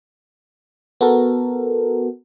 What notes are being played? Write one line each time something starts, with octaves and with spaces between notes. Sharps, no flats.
B3 F#4 A4 A#4